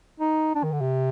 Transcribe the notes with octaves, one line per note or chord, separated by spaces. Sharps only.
D#4
D4
D#3
D3
C3